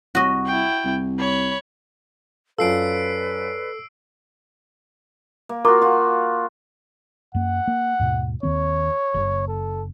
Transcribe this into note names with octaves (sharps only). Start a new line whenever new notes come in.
C2 F#4 D#5
E4 G5
C2
C#5 B5
F#2 F4 A4 B4 D5 E6 C7 D7
A#3
F4 F#4 A#4 A#5 D6
F4 F#4
F#2 A#3 F#5
A#3
D#2 G#2 B2
D#2 D#3 C4 C#5
F#1
A4